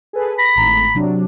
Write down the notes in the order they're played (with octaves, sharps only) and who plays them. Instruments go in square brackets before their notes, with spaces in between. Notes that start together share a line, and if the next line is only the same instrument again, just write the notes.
[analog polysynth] G#4 A4 B4
[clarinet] B5 [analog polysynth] A#6
[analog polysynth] G#1 A2 A#5
C3 F#3 D4